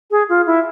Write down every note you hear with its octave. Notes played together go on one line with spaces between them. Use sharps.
G#4
F4
E4